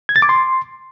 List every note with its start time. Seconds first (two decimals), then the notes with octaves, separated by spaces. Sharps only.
0.09 G#6
0.16 A6
0.22 D6
0.29 C6